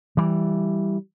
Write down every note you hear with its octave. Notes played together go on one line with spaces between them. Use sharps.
E3 G3